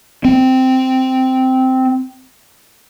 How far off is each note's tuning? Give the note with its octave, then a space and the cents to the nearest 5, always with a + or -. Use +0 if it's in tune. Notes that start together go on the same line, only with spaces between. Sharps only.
C4 -10